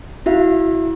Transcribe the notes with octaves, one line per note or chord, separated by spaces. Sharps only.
E4 F#4 E5 F5